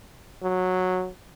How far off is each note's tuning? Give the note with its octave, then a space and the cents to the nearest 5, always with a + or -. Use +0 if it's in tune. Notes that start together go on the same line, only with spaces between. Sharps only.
F#3 -10